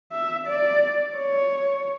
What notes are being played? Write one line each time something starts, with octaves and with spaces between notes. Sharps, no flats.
E5
D5
C#5